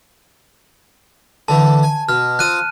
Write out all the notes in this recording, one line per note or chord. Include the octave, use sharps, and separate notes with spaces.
D3 E3 A3 A5
G#5
B2 F6
C4 F4 D#6 F#6 D#7